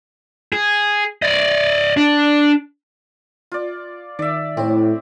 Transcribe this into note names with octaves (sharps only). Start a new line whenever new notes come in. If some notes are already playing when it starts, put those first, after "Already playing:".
G#4
D5 D#5
D4
F4 D5
D#3 D5 E5
A2 C4 E4 C#5